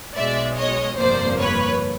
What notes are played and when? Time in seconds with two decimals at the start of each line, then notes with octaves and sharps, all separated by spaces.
0.16 B1 B2 G#3 D5 E5
0.57 C#5 D#5
0.98 G1 F2 C3 F3 A#3 C5 D5
1.39 B4 C#5